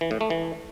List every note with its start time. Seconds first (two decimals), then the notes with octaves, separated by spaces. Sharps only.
0.01 E3
0.11 A2
0.21 A3
0.30 E3